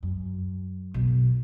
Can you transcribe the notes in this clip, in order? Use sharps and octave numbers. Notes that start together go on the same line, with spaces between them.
F#2
B1